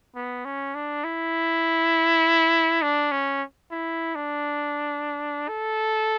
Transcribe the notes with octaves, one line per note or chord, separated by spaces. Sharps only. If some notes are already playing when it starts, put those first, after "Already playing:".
B3
C#4
D4
E4
D4
C#4
E4
D4
A4